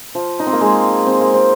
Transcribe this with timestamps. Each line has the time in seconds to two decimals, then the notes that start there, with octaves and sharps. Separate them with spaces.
0.15 F3
0.40 D#4
0.47 C4
0.53 A#3
0.61 G#3
1.07 C4
1.20 A#3
1.34 C4